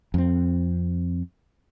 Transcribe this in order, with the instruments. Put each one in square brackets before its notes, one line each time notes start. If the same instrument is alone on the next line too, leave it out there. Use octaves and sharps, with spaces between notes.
[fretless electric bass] F2 C4